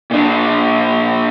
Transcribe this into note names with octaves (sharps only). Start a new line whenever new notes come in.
A#2 D4